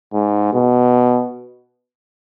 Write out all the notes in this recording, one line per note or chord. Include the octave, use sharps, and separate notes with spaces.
G#2
B2